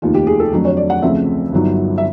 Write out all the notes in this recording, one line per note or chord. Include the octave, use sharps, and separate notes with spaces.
F1 D#2 D#3 F4
G4
G#4
A4
F2 D3 F#3 A3
C#5
D5
F#5
D2 C#3 F3 A3 C4 E5
G1 G2 D#3 F#3
E5